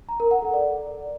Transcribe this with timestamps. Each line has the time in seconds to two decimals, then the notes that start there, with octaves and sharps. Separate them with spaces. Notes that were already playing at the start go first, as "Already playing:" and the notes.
0.09 A#5
0.20 A#4
0.31 F#5
0.42 A4
0.54 D5